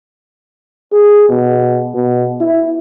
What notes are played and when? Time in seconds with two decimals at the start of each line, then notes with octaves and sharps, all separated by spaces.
0.92 G#4
1.29 B2
1.95 B2
2.41 E4